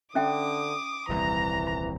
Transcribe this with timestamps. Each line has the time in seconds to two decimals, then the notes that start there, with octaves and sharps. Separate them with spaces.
0.15 D3 C#4 E5 G5 D6 D#6
1.09 D#1 C2 E3 A#5